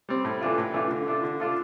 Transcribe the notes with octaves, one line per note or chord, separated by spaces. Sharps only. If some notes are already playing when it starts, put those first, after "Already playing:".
G3 C4
A2
E3 A3 D4 F4
A2
E3 A3 D4 F4
D3
A3 D4 F4 A4
D3
A3 D4 F4 A4